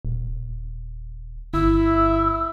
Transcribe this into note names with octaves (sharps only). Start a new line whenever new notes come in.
D#1
G1 E4 E6